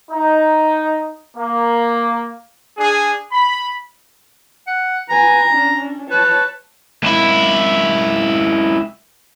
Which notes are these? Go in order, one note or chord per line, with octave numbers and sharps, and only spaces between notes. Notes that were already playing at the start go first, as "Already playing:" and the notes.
D#4
A#3
D4 G#4
B5
F#5
B4 G#5 A#5
C#4 D4
B4 C#5 A5
C#2 E4